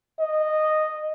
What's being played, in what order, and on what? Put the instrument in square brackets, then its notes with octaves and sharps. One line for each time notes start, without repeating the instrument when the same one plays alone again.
[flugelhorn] D#5